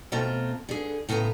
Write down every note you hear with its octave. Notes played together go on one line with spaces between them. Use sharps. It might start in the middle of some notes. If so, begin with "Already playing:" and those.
B2 A3 C4 F4 A#5
D3 G#4
A2 C#3 B3 A5 A#5